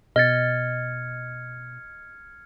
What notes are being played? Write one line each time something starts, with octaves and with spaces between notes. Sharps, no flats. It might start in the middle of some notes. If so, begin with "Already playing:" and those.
B2 D#5 F6 G#6 A6 C#7